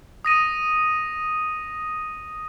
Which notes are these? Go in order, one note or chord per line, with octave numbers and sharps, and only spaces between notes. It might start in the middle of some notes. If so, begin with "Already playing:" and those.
D#6 A#6 D#7